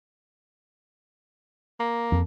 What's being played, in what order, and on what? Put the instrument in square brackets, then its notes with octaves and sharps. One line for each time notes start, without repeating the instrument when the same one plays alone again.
[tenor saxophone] A#3
[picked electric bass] F2